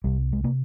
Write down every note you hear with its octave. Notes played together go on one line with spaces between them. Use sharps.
C2 C3 G3
G#3
C3 A#3